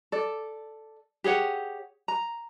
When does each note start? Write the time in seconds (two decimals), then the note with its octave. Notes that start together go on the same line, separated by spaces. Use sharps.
0.12 A4 D5
1.24 G4 G#4 C#5 F#5
2.08 A#5